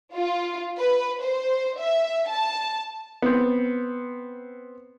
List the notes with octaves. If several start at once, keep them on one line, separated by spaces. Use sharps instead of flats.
F4
B4
C5
E5
A5
B3 C4